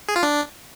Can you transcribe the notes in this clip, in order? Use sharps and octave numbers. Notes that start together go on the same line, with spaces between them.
G#4
F4
D4